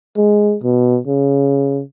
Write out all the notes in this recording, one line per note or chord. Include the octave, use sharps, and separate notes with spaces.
G#3
B2
C#3